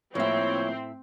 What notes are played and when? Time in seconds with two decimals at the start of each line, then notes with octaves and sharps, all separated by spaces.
0.15 A2 F3 A#3 C4 E4 C#5 E5